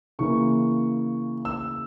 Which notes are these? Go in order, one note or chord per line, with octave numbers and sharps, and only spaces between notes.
C#3 E3 A#3 C#6
E6